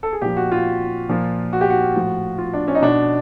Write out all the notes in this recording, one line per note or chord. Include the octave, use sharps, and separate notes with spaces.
A4
G#4
A#2 F3 G4
F#4
F4
A#2 F3
F#4
G4
F#4
A2 F3
F4
D4
C#4
D#4
B2 D4